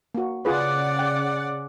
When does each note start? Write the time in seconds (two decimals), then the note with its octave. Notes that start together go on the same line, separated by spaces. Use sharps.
0.15 A#3 F#4
0.45 C#3 F4 G#4 B4 D5 F#5
0.99 G5